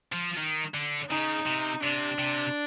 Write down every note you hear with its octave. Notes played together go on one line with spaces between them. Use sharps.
F3
D#3
D3
C#3 D#4
C3
C3 D4
C3